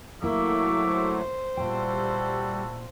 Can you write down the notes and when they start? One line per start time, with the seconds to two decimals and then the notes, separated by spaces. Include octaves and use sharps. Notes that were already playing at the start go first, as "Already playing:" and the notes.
0.23 F#3 A3 A#3 E4 A#4 E5 C#6 D6
0.86 C5
1.57 A#2 G3 E4 F#4 A4 G5